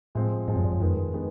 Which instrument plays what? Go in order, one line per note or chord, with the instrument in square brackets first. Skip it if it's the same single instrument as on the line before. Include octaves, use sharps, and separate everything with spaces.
[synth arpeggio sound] A2 [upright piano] F3 G#3 C4
[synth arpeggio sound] G#2 [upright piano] F3 G#3 C4
[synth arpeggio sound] F#2
G2
F#2
[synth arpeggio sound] F2 [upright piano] D#3 G#3 B3
[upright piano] D#3 G#3 B3